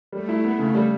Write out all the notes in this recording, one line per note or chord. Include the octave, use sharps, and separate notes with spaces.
G3 A3
E4
B3
C#3
G3